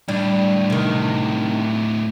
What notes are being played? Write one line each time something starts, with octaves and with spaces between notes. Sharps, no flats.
A2 G3 D4
C3 D#3